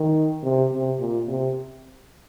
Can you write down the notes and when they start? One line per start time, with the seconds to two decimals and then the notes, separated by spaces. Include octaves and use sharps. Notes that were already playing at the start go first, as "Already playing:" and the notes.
Already playing: D#3
0.43 C3
0.72 C3
0.99 A#2
1.28 C3